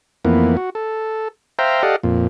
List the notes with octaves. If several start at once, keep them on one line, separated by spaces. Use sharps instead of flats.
F2 E3 A#3 B3
F#4
A4
C5 E5 F5 G5 A#5
G4 A4 D5 D#5 F5 F#5
F2 A#2